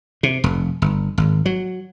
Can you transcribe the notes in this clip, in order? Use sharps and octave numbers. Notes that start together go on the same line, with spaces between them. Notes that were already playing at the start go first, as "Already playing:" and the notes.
C3
F1
G1
G#1
F#3